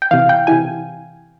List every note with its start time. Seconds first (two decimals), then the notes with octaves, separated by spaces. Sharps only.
0.02 G5
0.11 C3 E3 F5
0.29 G5
0.47 C3 E3 G#5